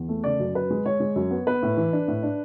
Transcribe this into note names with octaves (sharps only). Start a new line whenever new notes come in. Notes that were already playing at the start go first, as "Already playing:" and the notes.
Already playing: E2
A3
C#3 D5
F#2
F#2 B4
G#3
G#3 C#5
G#3
F#2
B3
B3 B4
A2
E3
D4
A2
D4